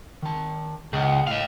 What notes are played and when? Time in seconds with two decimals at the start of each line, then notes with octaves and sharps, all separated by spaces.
0.22 D#3 A5
0.93 C#2 G#4 D#5 F#5
1.27 A2 D#5 F5